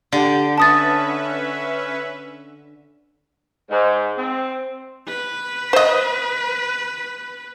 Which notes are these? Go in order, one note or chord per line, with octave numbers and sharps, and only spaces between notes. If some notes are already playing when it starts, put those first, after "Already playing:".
D3 G4
C#4 B4 E5 A5 D#6 A6
G#2
C4
B4
C5 D#5